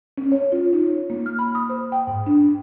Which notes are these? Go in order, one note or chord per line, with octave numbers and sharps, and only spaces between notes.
C#4
C#5
F4
D#4
A#3
F6
B5
D#6
C5
G5
G#2
D4